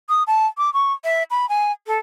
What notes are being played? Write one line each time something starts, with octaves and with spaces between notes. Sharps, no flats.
D#6
A5
D6
C#6
E5
B5
G#5
A4